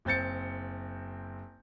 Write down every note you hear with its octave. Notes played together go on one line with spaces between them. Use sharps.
F#1 C4 G6 A6 C#7